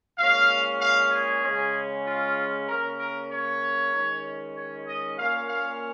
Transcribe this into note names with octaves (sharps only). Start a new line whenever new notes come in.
A#2 G#3 C#4 F5
F5
G#4
C#3 G#3 C#4
F4
C#3 A#3 C#4 A#4
A#4
C#5
D#3 G#3 C#4
C#5
D#5
A#2 A#3 C#4 F5
F5